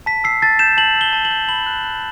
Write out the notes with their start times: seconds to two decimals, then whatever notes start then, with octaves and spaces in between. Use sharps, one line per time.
0.06 A5 B6
0.24 E6 C7
0.42 A5 A6
0.59 G6 E7
0.77 A5 F#7
0.96 E6
1.01 G7
1.13 A5
1.25 F#7
1.31 G6
1.49 B5 F#7
1.67 F#6
1.84 F#6